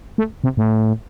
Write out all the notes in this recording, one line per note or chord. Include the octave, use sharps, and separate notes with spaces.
A3
C3
A2